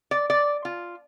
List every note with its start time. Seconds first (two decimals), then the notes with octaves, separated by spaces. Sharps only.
0.11 D5
0.30 D5
0.65 F4